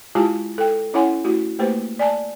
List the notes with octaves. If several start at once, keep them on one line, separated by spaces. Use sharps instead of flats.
G#3 E4 F4 G4 G#5 A5
A4 G5
C#4 E4 C#5 F#5 G#5 C6
A3 E4 F#4 G4
A3 A#3 G4 B4 C5
D5 G#5 A5